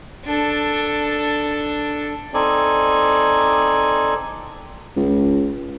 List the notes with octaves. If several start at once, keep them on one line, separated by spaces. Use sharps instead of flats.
D4 A4
C4 D#4 A4 D5 G#5
C#2